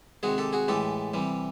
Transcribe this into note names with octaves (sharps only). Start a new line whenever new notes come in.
C3 D#3 G#3 F#4 G#4
G4 A4
F#4 G#4
A2 E3 G#3 G4 A4
C3 E3 G3